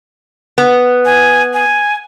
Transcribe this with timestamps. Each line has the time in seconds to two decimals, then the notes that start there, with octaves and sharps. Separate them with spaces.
0.58 B3
1.05 G#5
1.53 G#5